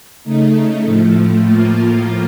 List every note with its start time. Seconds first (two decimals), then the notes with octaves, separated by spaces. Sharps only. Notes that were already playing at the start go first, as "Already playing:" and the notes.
0.24 C#3 A3 D#4
0.84 A2 F3 A3
1.45 A2 F3 A#3 F4